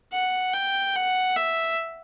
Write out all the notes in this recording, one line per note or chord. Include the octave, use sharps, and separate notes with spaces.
F#5
G5
F#5
E5